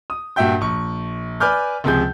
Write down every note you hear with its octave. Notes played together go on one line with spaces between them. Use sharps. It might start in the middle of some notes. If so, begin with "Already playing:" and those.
D#6
G2 A#2 F#4 E5 G5 G6
A#1 C#6
B4 D5 G#5 D6 F6 G6
C#2 C3 F3 G#4 G6